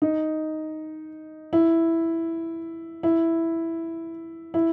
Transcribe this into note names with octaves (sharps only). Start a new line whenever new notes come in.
D#4
E4
E4
E4